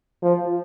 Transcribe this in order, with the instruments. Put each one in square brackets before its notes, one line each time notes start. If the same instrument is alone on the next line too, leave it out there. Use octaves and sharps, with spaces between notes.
[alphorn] F3